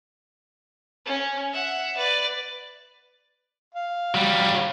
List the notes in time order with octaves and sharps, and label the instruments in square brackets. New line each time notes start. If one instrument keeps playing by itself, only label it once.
[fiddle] C#4
E5 F#5
B4 D5
[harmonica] F5
[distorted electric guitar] F#3 G3